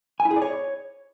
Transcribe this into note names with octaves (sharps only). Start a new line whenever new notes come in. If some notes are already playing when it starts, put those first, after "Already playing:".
G#5
E4
G#4
D5
C#5